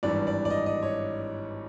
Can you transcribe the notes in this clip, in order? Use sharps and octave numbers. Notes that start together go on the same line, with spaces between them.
G#1 G2 E3 D5
D5
D5
D#5
D#5
C#5